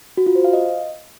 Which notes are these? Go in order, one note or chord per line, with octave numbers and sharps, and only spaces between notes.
F#4
F4
C5
F5
D#5